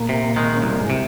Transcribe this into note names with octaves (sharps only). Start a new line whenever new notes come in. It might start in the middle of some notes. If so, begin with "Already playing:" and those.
Already playing: A#2 A#3
C3
D#3 G#3
C#4
C2 C4
A#3
G#2 G#3
C3